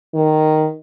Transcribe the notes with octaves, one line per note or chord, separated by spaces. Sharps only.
D#3